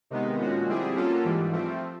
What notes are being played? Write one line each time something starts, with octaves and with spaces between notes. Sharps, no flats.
C3 D#3 G#3 B3 D#4
A#2 F3 G#3 C#4 F#4
D3 G3 C4 E4 G#4
F#3 A#3 C#4 F4 A4
G#2 E3 G3
F3 A3 C4